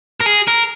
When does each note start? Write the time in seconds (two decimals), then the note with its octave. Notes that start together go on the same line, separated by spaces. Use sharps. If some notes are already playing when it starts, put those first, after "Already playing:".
0.20 A#4
0.26 G#4
0.48 A#4